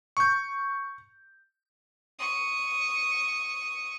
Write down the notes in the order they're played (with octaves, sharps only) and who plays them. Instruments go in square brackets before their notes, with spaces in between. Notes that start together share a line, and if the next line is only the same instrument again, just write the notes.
[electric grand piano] C#6 G6
[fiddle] C#6 D#6